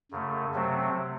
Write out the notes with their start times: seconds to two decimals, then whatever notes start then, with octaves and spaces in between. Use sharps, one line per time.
0.11 F#2 C#3 A3
0.54 C3 F#3 A3 C4